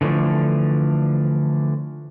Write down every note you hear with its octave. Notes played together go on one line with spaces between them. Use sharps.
D3 E3 F3 A3 D4